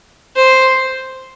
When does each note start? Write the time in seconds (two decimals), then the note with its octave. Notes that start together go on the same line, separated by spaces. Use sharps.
0.36 C5